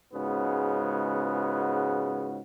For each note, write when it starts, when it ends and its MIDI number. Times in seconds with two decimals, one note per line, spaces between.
0.14 2.39 37
0.14 2.39 44
0.14 2.39 49
0.14 2.39 59
0.14 2.39 66